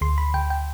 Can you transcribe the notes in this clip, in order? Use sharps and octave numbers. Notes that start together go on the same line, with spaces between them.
D2 C6
B5
D2 G5
G5